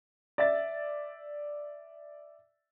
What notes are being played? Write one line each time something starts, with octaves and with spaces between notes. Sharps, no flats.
D5 E5 A6